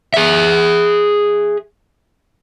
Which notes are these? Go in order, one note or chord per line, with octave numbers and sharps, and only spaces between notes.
G#4 E5